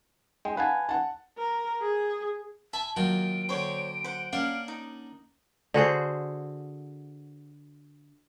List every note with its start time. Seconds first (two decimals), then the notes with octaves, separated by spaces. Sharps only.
0.45 G#3 G5
0.57 B4 F5 F#5 G#5 A5
0.89 F#5 A5
1.38 A#4
1.82 G#4
2.73 E5 G#5 A5 B5
2.96 D#3 F#3 A#3 F4 F#4 G5 D7
3.49 D3 C5 C#5 G5
4.04 C5 F#5
4.33 A#3 C#4 D4 F5 F#5
4.68 D#4
5.74 D3 F#4 G#4 C5